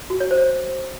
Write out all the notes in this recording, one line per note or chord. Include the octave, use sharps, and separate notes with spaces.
F#4
C#5
C5